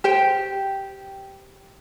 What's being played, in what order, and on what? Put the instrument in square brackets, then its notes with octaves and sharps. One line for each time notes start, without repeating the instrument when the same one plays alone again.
[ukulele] G4 C5 G5